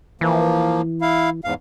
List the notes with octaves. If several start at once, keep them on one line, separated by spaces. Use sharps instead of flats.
E3 F3 A#3
E4 F5
E2 G#2 F5